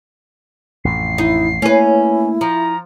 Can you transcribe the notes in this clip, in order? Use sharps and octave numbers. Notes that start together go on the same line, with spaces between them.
A1 F2 A2 C7
D#4 E4
A3 A#3 C#4 E4 B4
F3 A#5